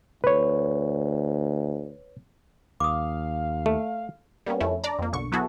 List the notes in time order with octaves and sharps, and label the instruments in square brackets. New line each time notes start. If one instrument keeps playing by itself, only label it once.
[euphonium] D2 [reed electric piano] B4 C#5
[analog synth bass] D#2 [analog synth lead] F5 [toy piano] D6 D#6
[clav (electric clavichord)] A3
[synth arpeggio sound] G3 A#3 B3 C#4
F2 A3 C#4 E4
D4 D5 A#5
F2 A#3
B1 D3 C#6
F#3 B3 E4 F#4 G#4 A4